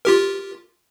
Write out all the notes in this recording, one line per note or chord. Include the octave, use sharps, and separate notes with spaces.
F4 G4 A#4